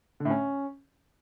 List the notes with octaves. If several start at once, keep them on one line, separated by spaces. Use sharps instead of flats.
D3
A2
C#4